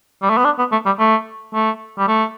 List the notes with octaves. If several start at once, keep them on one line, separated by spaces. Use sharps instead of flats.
G3
A3
B3
D4
B3
A3
G3
A3
A3
G3
A3